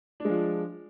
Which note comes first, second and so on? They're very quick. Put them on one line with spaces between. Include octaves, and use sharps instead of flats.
D4 G#3 F3